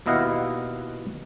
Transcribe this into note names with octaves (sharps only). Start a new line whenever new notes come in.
D#2 B2 E4 D#5 F5 F#5